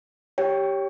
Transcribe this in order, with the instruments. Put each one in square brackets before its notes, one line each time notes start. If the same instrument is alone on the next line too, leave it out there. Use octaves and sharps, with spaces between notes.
[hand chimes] G4 C#5 G5